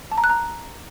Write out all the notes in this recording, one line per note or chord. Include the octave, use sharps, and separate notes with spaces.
A5
A#5
F#6
A#5